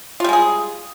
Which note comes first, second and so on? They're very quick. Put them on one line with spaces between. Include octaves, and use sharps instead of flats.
F4 G3 G#3 G#4